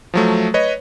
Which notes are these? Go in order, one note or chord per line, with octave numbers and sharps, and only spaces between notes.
F3 F#3 A3
B4 C#5 D#5